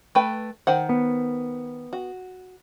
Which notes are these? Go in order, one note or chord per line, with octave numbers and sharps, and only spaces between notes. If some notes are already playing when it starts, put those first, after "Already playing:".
A3 B4 G5
D#3 C5 F#5
B3
F#4